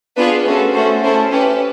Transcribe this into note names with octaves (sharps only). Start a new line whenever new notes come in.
B3 D4 F4 G#4 B4
A3 C#4 F#4 A4 B4
A3 C#4 F#4 A4 C5
A3 C#4 E4 A4 C5
C#4 E4 G4 B4